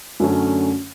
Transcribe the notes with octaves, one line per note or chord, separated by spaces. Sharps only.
F#2 D3 F#3 A3 C#4